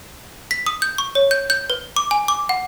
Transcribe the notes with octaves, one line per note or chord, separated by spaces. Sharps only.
B6
D#6
G6
C#6
C#5
G6
G6
B4
D6
G#5
D6
F#5